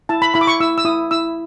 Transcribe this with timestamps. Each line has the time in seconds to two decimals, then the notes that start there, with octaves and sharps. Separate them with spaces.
0.09 E4 A5
0.22 B5
0.34 E4 B5
0.41 D6
0.47 C#6
0.60 E4 E6
0.78 E6
0.85 E4 D#6
1.11 E4 E6